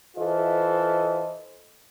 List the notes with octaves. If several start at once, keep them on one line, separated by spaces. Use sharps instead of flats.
E3 F4 A4 C5 D#5